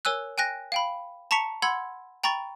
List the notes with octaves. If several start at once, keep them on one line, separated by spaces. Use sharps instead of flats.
A#4 C#5 G#5 E6 F#6
G5 G#5 F#6 A#6
F5 G5 B5
A5 A#5 C#6 B6 C#7 F7
F#5 B5 C6 E6 G#6
G5 A#5 B5 C#6 A6